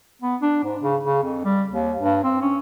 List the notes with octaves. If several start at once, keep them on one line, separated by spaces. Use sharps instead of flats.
B3
D4
G#2
C#3
C#3
F2
G3
D#2
G2
C4
C#4